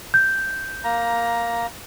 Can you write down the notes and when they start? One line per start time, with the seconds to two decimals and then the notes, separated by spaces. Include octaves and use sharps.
0.14 G6
0.84 A#3 A#5